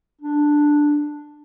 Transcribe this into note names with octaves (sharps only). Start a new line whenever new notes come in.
D4